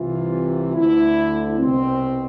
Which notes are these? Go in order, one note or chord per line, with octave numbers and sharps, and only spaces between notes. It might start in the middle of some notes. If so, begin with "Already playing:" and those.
Already playing: C2 C3 E3 F4
D2 D3 E4
C2 B2 C4